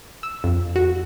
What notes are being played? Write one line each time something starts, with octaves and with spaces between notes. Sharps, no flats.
E6
F2
F#4